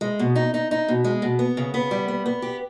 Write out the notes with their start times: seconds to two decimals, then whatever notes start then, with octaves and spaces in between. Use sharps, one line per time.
0.01 G#3
0.19 B2
0.35 D#4
0.54 D#4
0.71 D#4
0.88 B2
1.04 G#3
1.22 B2
1.39 B3
1.57 C#3
1.74 B3
1.91 G3
2.08 B3
2.26 B3
2.42 G4